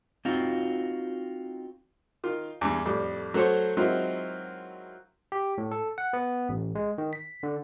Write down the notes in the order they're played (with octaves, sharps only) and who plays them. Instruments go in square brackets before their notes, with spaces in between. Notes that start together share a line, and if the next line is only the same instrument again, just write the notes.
[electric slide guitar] C4 D#4 F4 F#4
[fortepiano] D#3 F4
E2 G2
F2 A2 G3
F#3 A3 A4 C5 C#5
D#3 F#3 G#3 C4 E4 F4
[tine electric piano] G4
A2
A4
F#5
B3
A1
G#3
D#3
B6
D3